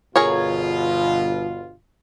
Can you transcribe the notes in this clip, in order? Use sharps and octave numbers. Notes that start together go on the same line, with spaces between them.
G1 B2 F4 G#4 A#4 C#5